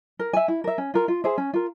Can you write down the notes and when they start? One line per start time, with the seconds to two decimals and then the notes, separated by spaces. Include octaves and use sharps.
0.19 A#4
0.33 E5 G#5
0.48 E4
0.64 A#4 E5
0.78 C#4
0.94 F4 A#4
1.08 F4
1.24 G#4 C5 E5
1.38 C#4
1.54 F4 A#4